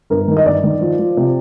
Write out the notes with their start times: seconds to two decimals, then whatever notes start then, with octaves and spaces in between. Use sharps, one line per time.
0.10 G1 A#4
0.28 D#3
0.37 D#5
0.45 G1 D5
0.64 D#3
0.81 F3
0.99 F3
1.17 C3